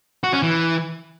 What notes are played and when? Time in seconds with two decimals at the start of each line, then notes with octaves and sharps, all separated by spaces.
0.24 F#4
0.33 C#4
0.43 E3